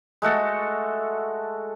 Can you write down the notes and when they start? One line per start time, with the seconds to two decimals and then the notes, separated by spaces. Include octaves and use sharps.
0.22 G#3 A3 F#4 A4